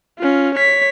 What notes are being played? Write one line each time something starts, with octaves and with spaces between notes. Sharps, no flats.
C#4 F4
C#5 B6